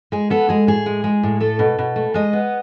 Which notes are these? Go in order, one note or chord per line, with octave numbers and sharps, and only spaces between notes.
G#3 G#4
B3 A4
G#3 G#4
A2 G#4
G#3
G#3
A2
A3 A4
B2
B2
A3
G#3 D#5
B3